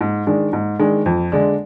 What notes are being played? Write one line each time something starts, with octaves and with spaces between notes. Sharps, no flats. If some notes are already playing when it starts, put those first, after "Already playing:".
G#2
D#3 G#3 D4
G#2
D#3 G#3 D4
F2
D3 G#3 D4